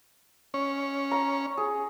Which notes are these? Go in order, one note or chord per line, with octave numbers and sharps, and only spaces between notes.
C#4
A#5
G#4